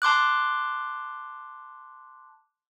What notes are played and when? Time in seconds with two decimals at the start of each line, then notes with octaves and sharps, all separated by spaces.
0.02 A5 C6 D6 F#6